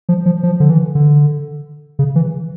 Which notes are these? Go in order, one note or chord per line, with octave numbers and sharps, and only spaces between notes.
F3
F3
F3
D3
E3
D3
C#3
E3